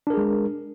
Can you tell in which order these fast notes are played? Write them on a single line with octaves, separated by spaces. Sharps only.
D4 A#4 G#4 G#3